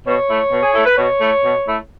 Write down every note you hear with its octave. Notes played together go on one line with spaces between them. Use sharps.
B2 C#5
A3 E4
B2
G#4
A3 E4 A4
B4
B2 C#5
A3 E4
B2
A3 E4